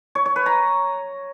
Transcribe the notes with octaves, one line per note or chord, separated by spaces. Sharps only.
C#5
C#5
B4
A#5